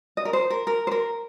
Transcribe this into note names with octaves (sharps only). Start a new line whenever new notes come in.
D#5
A#4
C5
A#4
A#4
C5
A#4